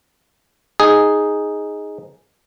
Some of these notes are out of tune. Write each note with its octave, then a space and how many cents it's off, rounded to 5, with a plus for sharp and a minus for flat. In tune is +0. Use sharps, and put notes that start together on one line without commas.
D#4 +0 G#4 +0